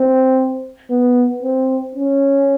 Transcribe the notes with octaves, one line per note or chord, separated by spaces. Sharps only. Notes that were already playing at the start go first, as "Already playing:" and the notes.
Already playing: C4
B3
C4
C#4